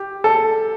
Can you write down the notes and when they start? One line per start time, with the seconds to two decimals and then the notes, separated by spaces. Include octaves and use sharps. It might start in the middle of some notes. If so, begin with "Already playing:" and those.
Already playing: G4
0.24 A4